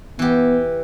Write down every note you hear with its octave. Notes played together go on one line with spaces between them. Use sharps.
E3 B3 G4